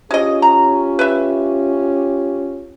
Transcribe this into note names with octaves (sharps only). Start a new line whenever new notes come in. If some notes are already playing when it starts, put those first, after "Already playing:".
G#3 C#4 F4 G4 D#5
A#5
B4 E5